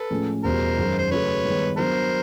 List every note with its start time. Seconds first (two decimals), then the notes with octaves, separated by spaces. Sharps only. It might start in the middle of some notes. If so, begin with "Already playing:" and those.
Already playing: A4 B4
0.10 A2 F3 G#3 C#4
0.43 E2 B2 G3 A#4 C5
0.78 F#2 D#3 G#3
0.98 C5
1.10 C#3 F#3 A3 B4 C#5
1.44 G2 D#3 G#3 B3
1.77 F#3 B3 D4 A#4 C5